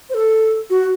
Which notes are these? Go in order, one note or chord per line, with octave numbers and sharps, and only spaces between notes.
C5
A4
F#4